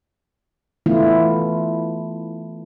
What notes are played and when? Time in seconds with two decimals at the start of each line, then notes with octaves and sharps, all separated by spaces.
0.86 E3 A3 B3 E4 F4